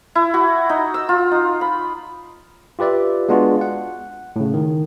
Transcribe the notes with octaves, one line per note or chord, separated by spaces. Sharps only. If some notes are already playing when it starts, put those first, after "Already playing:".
E4
F#4
D#4
E6
F4
D#4
B5
F4 G4 B4 D5 E5
G#3 B3 D4 F4 F#4
F#5
A2 C#3
D#3